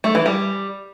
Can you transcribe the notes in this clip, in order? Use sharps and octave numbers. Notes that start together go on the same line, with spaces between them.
A3
E3
G3